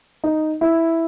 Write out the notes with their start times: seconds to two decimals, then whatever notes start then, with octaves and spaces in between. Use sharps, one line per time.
0.24 D#4
0.61 E4